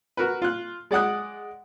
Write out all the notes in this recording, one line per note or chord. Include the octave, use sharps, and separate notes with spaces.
F#4 A#4 B4
F4 F#6
G#3 D5 F#5 D#6 F#6